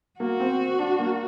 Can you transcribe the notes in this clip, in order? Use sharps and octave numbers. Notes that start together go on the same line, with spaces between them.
A#3 F#4
C4
D4
A#3